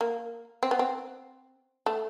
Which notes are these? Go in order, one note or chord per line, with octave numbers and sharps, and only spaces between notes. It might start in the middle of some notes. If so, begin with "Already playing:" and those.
A#3
C4
B3
C4
A3